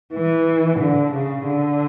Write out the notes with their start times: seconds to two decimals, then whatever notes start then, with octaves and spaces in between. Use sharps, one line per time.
0.14 E3
0.80 D3
1.13 C#3
1.46 D3